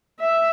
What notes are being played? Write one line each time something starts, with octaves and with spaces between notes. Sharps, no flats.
E5